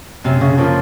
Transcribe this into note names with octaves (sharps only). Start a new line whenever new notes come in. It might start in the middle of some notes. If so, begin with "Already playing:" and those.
F#2 C3
C#3
C#3 F3 A#3 F4